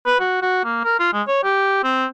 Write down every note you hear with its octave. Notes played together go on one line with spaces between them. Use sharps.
B4
F#4
F#4
A#3
A#4
F4
G#3
C#5
G4
C4